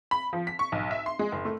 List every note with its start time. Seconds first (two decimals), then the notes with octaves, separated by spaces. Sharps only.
0.11 B5
0.33 F3
0.47 B6
0.59 C#6
0.72 B1
0.91 E5
1.06 C6
1.19 G#3
1.32 F#1
1.45 A3